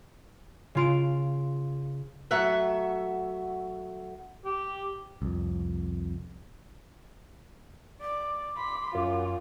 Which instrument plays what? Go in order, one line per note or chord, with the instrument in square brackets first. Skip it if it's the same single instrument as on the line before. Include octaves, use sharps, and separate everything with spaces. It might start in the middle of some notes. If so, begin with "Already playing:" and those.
[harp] C#3 F4 D7
[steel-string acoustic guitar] F#3 A3 A4 E5 F#5
[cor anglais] G4
[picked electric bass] C2 F2
[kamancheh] D5 [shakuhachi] D6
[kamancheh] B5 C6
[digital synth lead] F#2 [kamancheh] F4